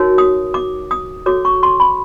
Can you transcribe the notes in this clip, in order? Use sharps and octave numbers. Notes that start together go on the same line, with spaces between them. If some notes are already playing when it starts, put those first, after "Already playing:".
Already playing: D#4 F#4 A#4 C#5
D#6
D6
D#6
F#4 A4 C#5 D6
C#6
C6
B5